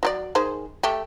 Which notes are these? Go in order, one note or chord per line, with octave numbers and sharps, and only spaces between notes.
F#3 G4 D5
D#3 G#4 C5
A3 G4